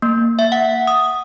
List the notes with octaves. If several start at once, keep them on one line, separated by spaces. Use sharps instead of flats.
A#3
E5
F#5
D#6